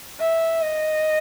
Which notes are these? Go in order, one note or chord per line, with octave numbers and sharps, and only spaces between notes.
E5
D#5